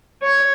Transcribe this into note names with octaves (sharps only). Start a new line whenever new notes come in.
C#5